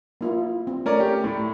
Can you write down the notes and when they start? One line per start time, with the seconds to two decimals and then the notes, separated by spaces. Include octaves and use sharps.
0.21 A#3 E4 F4
0.67 C4
0.86 A3 C#4 A#4 D5
1.00 G4
1.24 A2